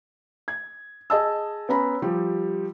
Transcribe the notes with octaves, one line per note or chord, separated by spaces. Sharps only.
G#6
G#4 D#5 A5 E6
B3 C#4 A#5 B5
F3 G3 G4